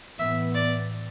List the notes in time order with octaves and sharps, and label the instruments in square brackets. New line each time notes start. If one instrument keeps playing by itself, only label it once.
[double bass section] A2 E3 B3 [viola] E5
[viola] D5